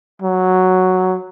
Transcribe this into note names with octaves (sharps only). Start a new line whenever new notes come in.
F#3